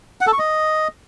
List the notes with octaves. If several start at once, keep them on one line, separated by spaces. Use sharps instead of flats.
F#5
A4
C#6
D#5